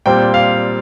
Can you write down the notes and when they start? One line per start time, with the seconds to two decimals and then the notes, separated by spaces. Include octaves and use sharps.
0.06 A#2 G3 C4 G5
0.34 F5